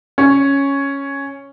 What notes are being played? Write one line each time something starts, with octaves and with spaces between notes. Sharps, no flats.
C#4